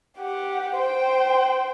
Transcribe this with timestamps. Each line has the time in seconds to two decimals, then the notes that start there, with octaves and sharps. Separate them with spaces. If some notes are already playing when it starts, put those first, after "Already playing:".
0.19 G4 F#5
0.76 C5 G5